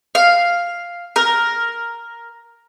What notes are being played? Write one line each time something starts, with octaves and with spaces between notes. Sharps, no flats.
F5
A#4